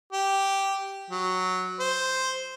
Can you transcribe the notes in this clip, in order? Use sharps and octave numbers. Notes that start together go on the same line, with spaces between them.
G4
F#3
C5